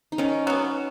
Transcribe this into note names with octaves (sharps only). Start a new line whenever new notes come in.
D#4
D#3 C#4
F#3 B3